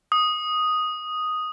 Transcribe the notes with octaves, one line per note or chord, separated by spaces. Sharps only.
D#6